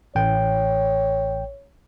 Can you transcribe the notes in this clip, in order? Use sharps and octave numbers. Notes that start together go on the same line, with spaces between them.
A1 C#5 G5